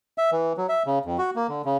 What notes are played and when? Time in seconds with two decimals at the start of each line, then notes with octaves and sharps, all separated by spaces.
0.18 E5
0.32 E3
0.57 F#3
0.69 E5
0.86 C#3
1.05 F2
1.18 F#4
1.36 A#3
1.49 D3
1.65 C#3